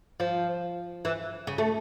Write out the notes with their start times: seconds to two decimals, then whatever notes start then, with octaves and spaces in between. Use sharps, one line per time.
0.20 F3
1.05 E3
1.47 C#3
1.58 A3